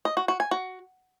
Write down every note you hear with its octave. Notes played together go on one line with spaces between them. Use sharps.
D#5
F#4
F#4
G#5
F#4